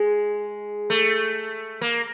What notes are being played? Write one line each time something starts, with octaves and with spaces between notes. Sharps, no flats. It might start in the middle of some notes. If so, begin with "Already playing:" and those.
Already playing: G#3
A3
A#3